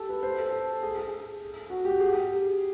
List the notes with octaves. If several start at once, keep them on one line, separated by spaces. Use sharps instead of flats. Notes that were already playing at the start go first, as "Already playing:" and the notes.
Already playing: G4 A4
B4
C5
A4
A4
G#4
G#4
F#4
G4
G#4
G4